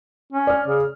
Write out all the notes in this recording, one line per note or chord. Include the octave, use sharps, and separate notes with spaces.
C#4
D5 F6
C#3